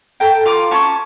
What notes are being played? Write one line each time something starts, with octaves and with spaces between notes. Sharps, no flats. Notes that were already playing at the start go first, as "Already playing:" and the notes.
A4 G5 A#5
F4 A#5 D6
C#4 A5 C#6